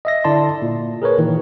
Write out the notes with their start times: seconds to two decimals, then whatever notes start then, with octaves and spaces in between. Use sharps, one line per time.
0.05 D#5 E5 A#6
0.24 D3 E4 D5 A5 C6
0.62 A#2
1.02 G#4 A#4 B4 C#5
1.17 A#2 D#3 E3